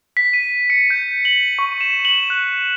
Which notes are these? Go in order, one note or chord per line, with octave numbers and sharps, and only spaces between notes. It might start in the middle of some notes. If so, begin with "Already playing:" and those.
B6
D#7
C#7
G6
F#7
C#6
E7
F#7
F#6